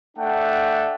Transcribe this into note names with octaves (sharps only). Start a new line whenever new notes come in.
A3 D4 F#5 G5